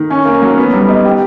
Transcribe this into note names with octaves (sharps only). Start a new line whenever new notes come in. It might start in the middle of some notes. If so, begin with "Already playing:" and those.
Already playing: D#3
C#4
A#3
F#3
B3
G3
D#4
G4